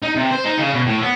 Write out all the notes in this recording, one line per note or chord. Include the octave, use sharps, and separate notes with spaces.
D#4
C3
C5
D#4
C#3
B2
A2
B3